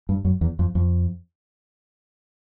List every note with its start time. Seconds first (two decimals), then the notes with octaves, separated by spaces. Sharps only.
0.09 G2
0.25 F#2
0.41 E2
0.59 F2
0.75 F2